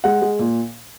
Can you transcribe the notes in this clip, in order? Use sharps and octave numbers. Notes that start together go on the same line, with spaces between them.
G#3 F#5
G#3
A#2